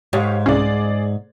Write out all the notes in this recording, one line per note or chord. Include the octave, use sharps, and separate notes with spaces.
G#2 G4 C#5 F5
C2 C#4 G#4 D5